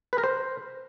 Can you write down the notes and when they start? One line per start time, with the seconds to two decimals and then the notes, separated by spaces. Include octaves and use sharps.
0.13 B4
0.18 A#4
0.23 C5